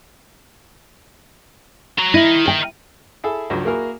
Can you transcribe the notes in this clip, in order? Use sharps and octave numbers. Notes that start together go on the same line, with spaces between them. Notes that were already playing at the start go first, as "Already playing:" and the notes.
F#4 A#5
E4 A#4 D#5
G5
E4 G#4 A4 E5
C#2 G2 F#3
A#3 E4 F#4 G#4 A#4